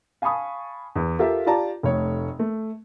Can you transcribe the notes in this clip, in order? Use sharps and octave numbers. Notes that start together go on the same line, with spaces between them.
F5 G#5 A5 B5 C#6 D#6
E2
F4 G4 A4 A#4 E5 F5
F4 G4 D5 A5 A#5
F1 A3 C#5
A3